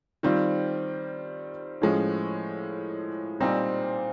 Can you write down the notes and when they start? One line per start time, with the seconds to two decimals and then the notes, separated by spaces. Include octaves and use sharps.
0.23 D#3 G3 C4 F4
1.82 A2 F3 G#3 C#4
3.40 A#2 G3 C4 D#4